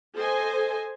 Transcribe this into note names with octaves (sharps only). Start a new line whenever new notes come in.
A4 C5 D#5 G#5